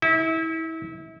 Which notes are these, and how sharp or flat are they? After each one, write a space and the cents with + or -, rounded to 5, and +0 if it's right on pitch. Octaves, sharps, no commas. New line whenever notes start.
E4 -30